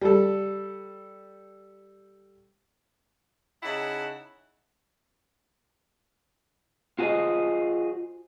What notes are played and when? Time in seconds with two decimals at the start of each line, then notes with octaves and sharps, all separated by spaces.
0.01 G3 A4
3.63 C#3 D#4 E4 F#5 A5
6.99 F4 F#4 G#4 A4 C5 D#5